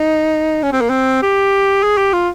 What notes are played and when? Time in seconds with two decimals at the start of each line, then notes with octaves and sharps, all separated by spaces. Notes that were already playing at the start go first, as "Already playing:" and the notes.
Already playing: D#4
0.63 C#4
0.72 C4
0.81 A#3
0.90 C4
1.23 G4
1.83 G#4
1.98 G4
2.13 F4